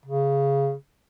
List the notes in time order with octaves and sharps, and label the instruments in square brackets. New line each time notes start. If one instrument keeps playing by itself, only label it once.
[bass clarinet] C#3